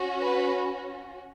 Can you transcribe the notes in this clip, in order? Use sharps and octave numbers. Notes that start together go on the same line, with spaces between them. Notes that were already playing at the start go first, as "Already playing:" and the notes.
Already playing: C#4 F#4
B4